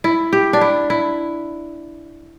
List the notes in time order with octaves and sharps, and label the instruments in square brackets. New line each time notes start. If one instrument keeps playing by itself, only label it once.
[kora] E4
G4
D4
E4
E4